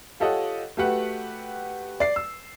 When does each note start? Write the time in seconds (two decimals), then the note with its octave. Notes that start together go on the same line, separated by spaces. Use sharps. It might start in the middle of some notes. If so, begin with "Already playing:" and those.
0.20 F4 G4 A4 C#5 D#5 F#5
0.77 A3 F#4 G4 B4 F#5
2.00 D5 C7
2.16 E6